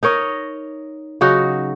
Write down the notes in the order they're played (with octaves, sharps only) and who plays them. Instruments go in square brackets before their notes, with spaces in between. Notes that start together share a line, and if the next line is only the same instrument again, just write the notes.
[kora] D#4 A#4 C#5 D#5
C#3 F#3 D#4 F#4